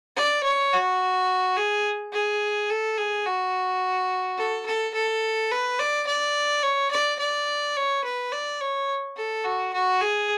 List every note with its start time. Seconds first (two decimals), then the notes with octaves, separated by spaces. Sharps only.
0.16 D5
0.44 C#5
0.73 F#4
1.57 G#4
2.13 G#4
2.70 A4
2.97 G#4
3.26 F#4
4.38 A4
4.66 A4
4.94 A4
5.51 B4
5.79 D5
6.07 D5
6.63 C#5
6.91 D5
7.19 D5
7.77 C#5
8.04 B4
8.32 D5
8.61 C#5
9.17 A4
9.44 F#4
9.73 F#4
10.01 G#4